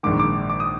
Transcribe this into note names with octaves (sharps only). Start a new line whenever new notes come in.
A#1 G#2 D#3 D6
C#6
D6
D6
D#6